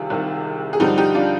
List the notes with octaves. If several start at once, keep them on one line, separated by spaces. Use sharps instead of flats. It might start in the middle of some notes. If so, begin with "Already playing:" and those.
Already playing: C2 C3 D#3 F4 G#4
C2 C3 D#3
G#4
G2 D3 F3 D#4 G4
D#4 G4
D4 F4